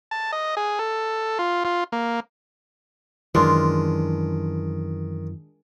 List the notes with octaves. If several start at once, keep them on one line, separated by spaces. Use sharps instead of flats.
A5
D#5
G#4
A4
F4
F4
A#3
F#2 D#3 E3 G#3 D4 F4